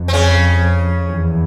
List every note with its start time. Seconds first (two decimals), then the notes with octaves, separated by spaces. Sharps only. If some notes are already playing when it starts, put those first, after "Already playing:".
Already playing: F2
0.08 C4
0.13 C#3 C#4
1.09 E2